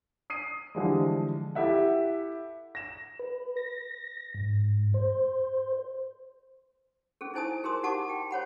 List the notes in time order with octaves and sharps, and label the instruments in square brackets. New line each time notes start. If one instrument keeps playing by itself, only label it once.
[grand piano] D#6 C7 D#7
D3 E3 F3 G3 G#3
E4 G4 A4 E5 F#5
A#6 E7
[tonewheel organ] B4
A#6
G#2
C5
[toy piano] C#4 G#4 A4
D#4 E4 C5 G#5 A5 D#6
G#4 A#4 C5 C6 D#6
D#4 G4 F#5 A5 D6
G5
C5 C#5 F#5 B5